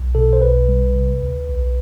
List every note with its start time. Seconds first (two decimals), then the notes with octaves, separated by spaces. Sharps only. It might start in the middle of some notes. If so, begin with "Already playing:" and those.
Already playing: B1
0.15 B2 A4
0.33 C5
0.42 B1 B4
0.69 G3
0.95 C3
1.22 D2
1.49 B1